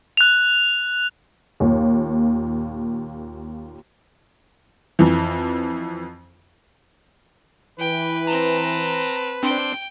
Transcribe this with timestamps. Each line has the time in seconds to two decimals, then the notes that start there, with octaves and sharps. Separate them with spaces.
0.17 F#6 F7
1.60 D#2 A#2
4.99 F2 E3
7.79 E3 B4 G5
8.27 C4 A5 A#5
9.43 C4 D4 G5 C6